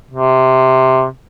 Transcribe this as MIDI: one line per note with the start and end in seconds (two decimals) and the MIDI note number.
0.11 1.06 48